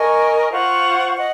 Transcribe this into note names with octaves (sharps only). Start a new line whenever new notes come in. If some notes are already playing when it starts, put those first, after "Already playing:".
Already playing: A#4 D#5 G#5 C#6
F4 C5 F#5 C#6
D#5 F#5